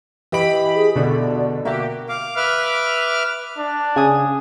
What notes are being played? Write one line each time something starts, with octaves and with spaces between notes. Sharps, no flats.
E3 G4 D#5 B5 D7
G#4
E2 B2 D3 A3 D5
A#3 F#4 G4 E5
F5 D6
B4 E5 D6 F6
D4
C#3 G#5 D#6